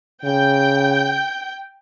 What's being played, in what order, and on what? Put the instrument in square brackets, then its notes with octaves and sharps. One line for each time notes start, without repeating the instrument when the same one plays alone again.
[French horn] C#3 [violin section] G5 G6